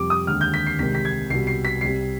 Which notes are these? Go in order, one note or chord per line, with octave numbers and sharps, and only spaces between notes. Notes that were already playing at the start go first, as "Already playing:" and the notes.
Already playing: F2 C3 G3 D6
D#6
D#2 D3 G#3 F6
G6
B6
C7
C2 C3 D#3 G#3 B6
B6
G#6
C2 B2 G3 C7
C7
B6
C2 C3 G3 C7